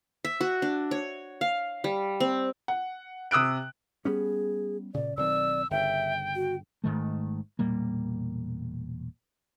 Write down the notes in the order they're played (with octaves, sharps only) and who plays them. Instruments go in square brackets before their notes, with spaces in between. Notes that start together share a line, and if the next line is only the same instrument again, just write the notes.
[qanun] E5
F#4
D4
C#5
F5
G3
C4
[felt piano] F#5
C3 D#6 E6 F#6 D7
[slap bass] G3 B3 C#4 [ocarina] G#4
[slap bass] A#2 C#3 [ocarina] D5
[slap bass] B1 D#3 C4 [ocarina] D5 [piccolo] E6
[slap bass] G1 C#3 [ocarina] E5 [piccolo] G5
[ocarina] F#4
[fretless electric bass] G#1 G#2 D#3 A3
E1 A#2 G3 A#3